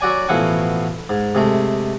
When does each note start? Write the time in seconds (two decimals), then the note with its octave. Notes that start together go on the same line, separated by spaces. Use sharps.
0.01 F#3 F#4 D5 G#5
0.28 A1 B2 F3 E4 F#5 G#5
1.09 G#2
1.35 C3 G#3 A3